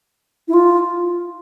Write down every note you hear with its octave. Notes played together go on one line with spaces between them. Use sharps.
E4
F4